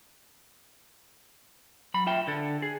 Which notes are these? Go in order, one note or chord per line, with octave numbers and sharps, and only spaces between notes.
F#3 B5
F4 E5 G5
D3 A4
G#4